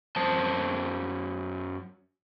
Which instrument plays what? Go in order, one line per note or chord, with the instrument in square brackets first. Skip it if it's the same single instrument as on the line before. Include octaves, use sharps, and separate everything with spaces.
[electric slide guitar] F#2 C5 A5